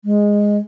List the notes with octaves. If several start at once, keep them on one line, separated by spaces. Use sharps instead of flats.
G#3